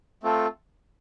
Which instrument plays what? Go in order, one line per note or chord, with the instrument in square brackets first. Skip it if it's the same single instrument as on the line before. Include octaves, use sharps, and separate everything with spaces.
[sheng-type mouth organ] A3 C4 F4 A4